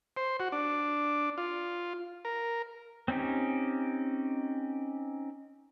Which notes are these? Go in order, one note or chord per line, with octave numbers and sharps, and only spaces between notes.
C5
F#4
D4
F4
A#4
C4 C#4 D#4 G4